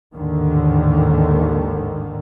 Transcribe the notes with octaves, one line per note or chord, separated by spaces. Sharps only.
A1 D#2 G#2 D3 D#3